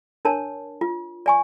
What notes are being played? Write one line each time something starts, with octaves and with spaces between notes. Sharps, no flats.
D4 A#4 C#5 A5
F4
D5 G#5 C#6